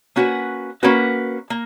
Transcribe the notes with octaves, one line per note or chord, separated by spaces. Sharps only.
A#3 C#4 F#4 B4
A#3 C#4 F#4 B4
A#3